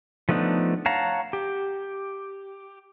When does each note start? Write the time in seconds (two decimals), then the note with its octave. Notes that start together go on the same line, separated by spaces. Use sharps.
0.29 F3 A3 B3 D4 D#4
0.86 C#5 F5 F#5 A5 A#5
1.33 G4